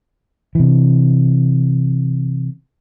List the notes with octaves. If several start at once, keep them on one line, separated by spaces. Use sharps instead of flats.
C3 E3